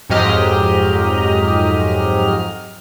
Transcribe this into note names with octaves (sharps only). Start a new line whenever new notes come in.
F2 G#2 F#3 G4 D#5 F6